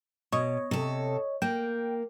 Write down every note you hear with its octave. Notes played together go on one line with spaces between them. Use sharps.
B2 C#5 D#5
C3 A4
A#3 G5